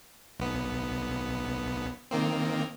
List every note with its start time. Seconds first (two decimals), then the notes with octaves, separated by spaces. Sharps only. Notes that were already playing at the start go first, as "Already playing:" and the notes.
0.39 B1 B3
2.11 D#3 A#3 C4